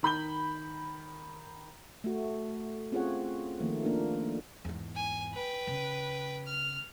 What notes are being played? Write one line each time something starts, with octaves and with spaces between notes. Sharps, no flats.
D#3 B5 G6 G7
A3 F#4
C4 C#4 F4 G#4 C#5 F#5
D#3 F3 A3 A#3
A#3 D4 F4 A#4
E2 G#2
G#5
B4 G5
C#3
F6